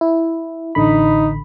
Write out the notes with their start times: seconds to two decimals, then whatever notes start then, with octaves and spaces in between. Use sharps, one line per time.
0.01 E4
0.75 A1 D3 D#4 B5